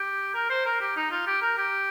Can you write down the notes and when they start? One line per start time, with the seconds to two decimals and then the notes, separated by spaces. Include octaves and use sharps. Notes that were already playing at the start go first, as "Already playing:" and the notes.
Already playing: G4
0.35 A#4
0.50 C5
0.66 A#4
0.81 G4
0.96 D#4
1.11 F4
1.27 G4
1.42 A#4
1.58 G4